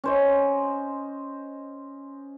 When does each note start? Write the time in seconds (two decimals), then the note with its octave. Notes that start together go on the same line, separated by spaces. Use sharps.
0.04 C#4 C5 D#5